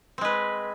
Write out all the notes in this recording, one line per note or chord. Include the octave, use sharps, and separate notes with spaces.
G#3 C4 B4